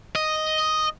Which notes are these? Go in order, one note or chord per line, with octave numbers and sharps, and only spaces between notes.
D#5